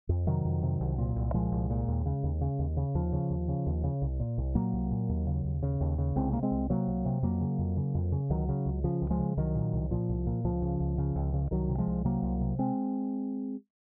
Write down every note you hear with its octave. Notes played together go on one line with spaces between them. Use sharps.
F2
C3 D#3 F#3
F2
C3
C2
A#2
C2
A#2 F3 G#3
C2
A#2
D#2
C#3
D#2
C#3
D#2
C#3
D#2 F3
C#3
D#2
C#3
D#2
C#3
C2
A#2
C2
A#2 F#3 A#3
C2
A#2
D#2
C#3
D#2
C#3
D#2
C#3
C2 G#3 C4
C3 A#3
G#3 C4
C2
C3 F#3 A#3
C2
C3
F2 F#3 A#3
C#3
F2
C#3
F2
C#3
C#2 D#3 F#3
C#3
C#2
C#3 F3
C#2
F3 G#3
C#3
C2 D#3 F#3
A#2
C2
A#2 F3
C2
A#2
C#2 F3
C#3
C#2
C#3
C#2
C#3
C2 D#3 F#3
C3
F3 G#3
C2
C3 F#3 A#3
C2
C3
G#3 C4